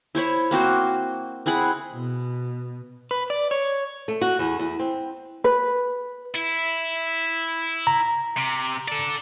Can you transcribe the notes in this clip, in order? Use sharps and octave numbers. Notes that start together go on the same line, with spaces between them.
E4 C5 C#5 B5
A#3 C4 F#4 C5
C4 E4 G#4 F#5
B2
B4
D5
C#5
A3
F#4
E2
E2
C4
B4
E4
A#5
C3
A4 D5